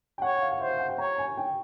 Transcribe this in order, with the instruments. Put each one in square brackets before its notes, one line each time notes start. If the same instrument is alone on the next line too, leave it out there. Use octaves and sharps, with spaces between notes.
[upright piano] G5
[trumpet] C#5 [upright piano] F#5
[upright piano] F#5
F5
F#5
[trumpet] C5 [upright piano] E5
[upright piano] F5
F#5
G5
[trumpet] C#5 [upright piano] A#5
[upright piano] G#5
G5